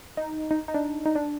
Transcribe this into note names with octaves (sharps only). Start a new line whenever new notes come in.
D#4
D#4
D#4
D4
D#4
D4